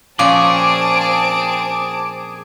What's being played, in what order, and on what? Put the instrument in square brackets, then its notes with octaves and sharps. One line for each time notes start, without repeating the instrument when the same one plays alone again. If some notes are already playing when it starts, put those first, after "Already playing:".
[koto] A#2 F3 C#4 [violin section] C4 A5 D7 [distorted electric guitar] G#4 [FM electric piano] D6